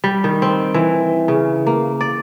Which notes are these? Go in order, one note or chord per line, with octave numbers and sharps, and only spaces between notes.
G3
D#3
C4
E3
C#3
A#3
D5